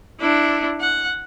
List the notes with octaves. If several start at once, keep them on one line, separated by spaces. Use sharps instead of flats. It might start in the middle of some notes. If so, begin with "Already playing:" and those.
D4 E4
F#5